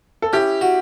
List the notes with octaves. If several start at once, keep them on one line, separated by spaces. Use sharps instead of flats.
A4
C#4 E4 G4
F#4